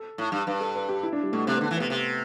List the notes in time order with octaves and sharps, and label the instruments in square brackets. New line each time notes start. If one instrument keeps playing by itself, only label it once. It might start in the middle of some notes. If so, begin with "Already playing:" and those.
Already playing: [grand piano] A4
[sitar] A2
G2
[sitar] G2 [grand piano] B4
[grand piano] A4
B4
G4
E4
D4
G3
[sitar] B2 [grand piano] A3
[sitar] C3 [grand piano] C4
[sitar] D3 [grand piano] B3
[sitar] E3 [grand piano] A3
[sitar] C3 [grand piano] B3
[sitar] C3